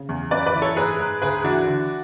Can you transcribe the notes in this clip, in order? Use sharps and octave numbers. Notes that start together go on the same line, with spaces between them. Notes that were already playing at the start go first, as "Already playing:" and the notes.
Already playing: C#3
E2
F#2 B4 D5
B4 D5
E3
A4 C#5
G#2 G#4 B4
G#2
D2 G#4 B4
E3 D4 F#4
D3